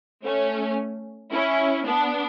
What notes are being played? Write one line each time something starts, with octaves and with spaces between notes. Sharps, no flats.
A3 C#4
C#4 E4
B3 D4